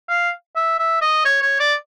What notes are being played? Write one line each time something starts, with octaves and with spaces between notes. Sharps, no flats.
F5
E5
E5
D#5
C#5
C#5
D5